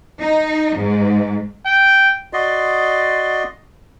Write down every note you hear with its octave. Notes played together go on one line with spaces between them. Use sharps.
D#4
G#2
G5
F#4 D5 D#5 C6